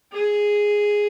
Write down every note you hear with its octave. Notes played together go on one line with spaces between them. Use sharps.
G#4